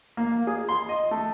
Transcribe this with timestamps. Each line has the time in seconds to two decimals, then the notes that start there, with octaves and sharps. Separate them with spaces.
0.17 A#3
0.47 G#4
0.69 C6
0.89 D#5
1.11 A3